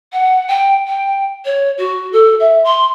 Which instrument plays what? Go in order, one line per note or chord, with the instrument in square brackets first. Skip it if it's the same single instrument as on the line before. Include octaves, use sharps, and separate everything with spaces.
[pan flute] F#5
G5
G5
C#5
F#4
A4
E5
C6